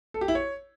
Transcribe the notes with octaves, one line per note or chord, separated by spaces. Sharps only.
A4
G4
E4
C#5